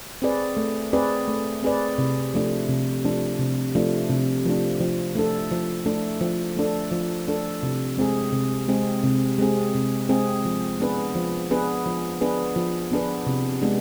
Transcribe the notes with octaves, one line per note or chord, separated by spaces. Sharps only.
C4 G#4 B4 D5
A3
C4 G#4 B4 D5
A3
C4 G#4 B4 D5
C3
F3 A3 D4
C3
F3 A3 D4
C3
F3 A3 D4
C3
F3 A3 D4
F3
A3 D4 A4
F3
A3 D4 A4
F3
A3 D4 A4
F3
A3 D4 A4
C3
G#3 C4 G#4
C3
G#3 C4 G#4
C3
G#3 C4 G#4
C3
G#3 C4 G#4
F3
B3 D4 G#4 B4
F3
B3 D4 G#4 B4
F3
B3 D4 G#4 B4
F3
B3 D4 G#4 B4
C3
G#3 B3 D4